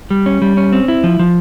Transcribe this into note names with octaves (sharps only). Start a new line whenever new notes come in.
G3
C#4
G3
C#4
C4
E4
F3
F3